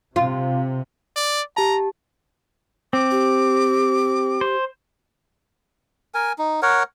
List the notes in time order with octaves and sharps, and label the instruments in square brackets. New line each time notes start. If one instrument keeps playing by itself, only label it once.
[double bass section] C3 [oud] F4
[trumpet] D5
[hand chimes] G4 A5 [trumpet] A#5
[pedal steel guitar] C4 [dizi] D6
[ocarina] G4
[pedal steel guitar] C5
[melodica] A#4 G#5
D#4
A#4 C#5 F#5